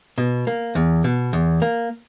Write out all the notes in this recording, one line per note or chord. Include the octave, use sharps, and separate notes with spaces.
B2
A#3
E2
B2
E2
A#3